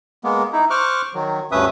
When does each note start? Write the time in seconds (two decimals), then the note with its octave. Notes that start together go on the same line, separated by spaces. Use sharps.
0.24 G#3 A#3 B3
0.53 D#4 E4
0.70 C5 C#6 D6 F6 F#6
1.14 D#3 F#3
1.52 D2 G2 C#4 B4 E5 D#6